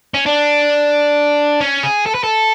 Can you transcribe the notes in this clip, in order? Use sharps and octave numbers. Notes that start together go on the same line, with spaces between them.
C#4
D4
C#4
G#4
A4
B4
A4